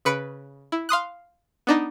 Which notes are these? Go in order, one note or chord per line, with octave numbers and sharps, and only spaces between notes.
C#3 B4 C#7 D7
E4
F5 C6 D#6 F#6
B3 D4 D#4